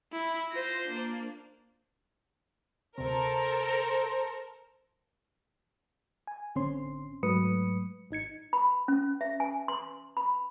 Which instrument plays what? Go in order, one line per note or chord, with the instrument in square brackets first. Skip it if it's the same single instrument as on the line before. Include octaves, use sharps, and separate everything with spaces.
[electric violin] E4
[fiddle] F4 C5 [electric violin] A#6
[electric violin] A#3 D4
[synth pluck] D2 C3 [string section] A4 A#4 [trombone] C5
[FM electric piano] G#5
A1 D3 C4 C#4 C6
G#2 F#3 A3 B4 D#6 C#7
G#1 D#4 G#6 C#7
[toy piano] B5
C#4
E5
G#5
C6
B5